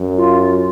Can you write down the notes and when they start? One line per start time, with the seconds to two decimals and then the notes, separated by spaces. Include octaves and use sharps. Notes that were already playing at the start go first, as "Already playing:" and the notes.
Already playing: F#2
0.17 F4